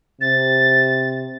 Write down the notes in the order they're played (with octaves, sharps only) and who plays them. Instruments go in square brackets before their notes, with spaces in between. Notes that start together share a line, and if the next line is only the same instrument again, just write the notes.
[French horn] C3 [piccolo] A6